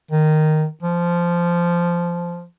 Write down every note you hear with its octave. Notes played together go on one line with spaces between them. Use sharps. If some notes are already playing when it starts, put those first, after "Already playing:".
D#3
F3